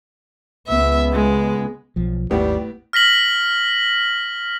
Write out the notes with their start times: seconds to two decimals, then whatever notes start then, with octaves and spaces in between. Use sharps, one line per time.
0.68 C#2 B3 E5
1.13 G#3
1.96 B1 F3
2.31 G#1 D#2 A2 G3 B3
2.93 F6 A#6 B6 F#7